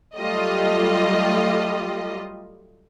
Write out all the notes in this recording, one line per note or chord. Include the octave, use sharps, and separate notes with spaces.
F#3 G3 A3 F4 G4 D#5